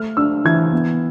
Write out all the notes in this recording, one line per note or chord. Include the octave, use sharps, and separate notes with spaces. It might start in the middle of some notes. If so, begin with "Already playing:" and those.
Already playing: A3 F6
D4 E6
E3 G#6
B3